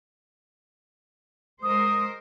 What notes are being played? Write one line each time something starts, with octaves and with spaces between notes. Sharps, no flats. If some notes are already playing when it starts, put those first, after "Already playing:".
G#3 A#4 C5 D#6